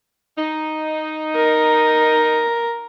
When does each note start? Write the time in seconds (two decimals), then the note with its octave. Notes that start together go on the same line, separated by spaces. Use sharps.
0.38 D#4
1.35 A#4